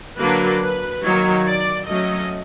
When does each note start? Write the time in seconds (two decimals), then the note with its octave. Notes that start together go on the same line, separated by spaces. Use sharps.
0.19 D3 F#3 A#3 D4 B4
0.61 B4
1.03 D#3 F#3 A#3 C#5
1.46 D5
1.87 F#3 A3 C#4 D#5